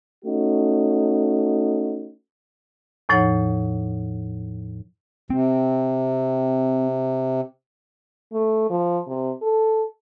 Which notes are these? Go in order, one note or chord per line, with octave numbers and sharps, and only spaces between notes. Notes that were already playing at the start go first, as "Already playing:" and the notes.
A3 C#4 D#4 F#4
E2 A2 F3 D#4 C#5 F#5
C3 C4
A3
F3
C3
A4